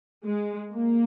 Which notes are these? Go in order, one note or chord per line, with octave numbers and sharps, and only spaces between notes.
G#3
A#3